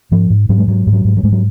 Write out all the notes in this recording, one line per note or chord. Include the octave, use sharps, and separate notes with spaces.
G#2 F3
G#2
G#2 F#3
G#3
G#2 F#3
G#2
F#3
G#2
F#3
G#2 G#3
F#3